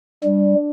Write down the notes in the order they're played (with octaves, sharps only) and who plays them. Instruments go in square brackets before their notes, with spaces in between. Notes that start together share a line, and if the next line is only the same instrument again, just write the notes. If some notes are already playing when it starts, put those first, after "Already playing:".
[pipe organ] G3 [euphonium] D4